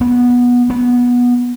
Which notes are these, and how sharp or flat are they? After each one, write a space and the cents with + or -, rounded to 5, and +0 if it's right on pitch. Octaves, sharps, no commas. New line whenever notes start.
B3 -15
B3 -20